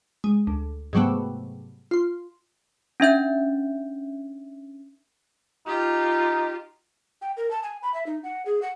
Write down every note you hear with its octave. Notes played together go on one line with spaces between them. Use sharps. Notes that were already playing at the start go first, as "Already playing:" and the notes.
G#3
D2
G#2 C3 F#3 G3 A3 B3
F4 C6
C#4 D4 E5 G6
D#4 F4 G4
G5
A#4
A5
G#5
B5
E5
D#4
F#5
G#4
F#5